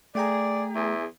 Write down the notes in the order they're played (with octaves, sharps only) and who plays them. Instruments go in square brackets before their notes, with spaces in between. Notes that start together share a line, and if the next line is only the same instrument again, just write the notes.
[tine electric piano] A3 G5 A#5 [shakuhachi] G#4 [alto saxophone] D5
[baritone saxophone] E2 [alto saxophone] E5